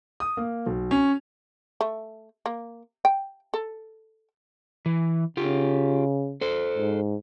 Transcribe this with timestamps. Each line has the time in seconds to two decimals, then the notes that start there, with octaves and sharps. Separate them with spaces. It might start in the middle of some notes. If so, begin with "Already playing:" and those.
0.20 D#6
0.37 A#3
0.66 B1
0.91 C#4
1.81 A3
2.46 A#3
3.05 G5
3.54 A4
4.86 E3
5.37 C#3 F4 G4
6.41 A4 C5
6.77 G#2